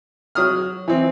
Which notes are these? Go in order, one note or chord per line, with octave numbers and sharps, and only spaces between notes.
F#3 D#6 F6
E3 C4